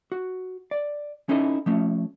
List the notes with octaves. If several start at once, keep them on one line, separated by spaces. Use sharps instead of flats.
F#4
D5
C#4 D#4 E4 A4 D#5
F3 A3 C#4